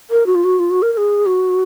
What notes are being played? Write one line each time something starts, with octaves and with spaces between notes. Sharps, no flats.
A#4
F#4
F4
F#4
F4
F#4
A#4
A#4
G#4
F#4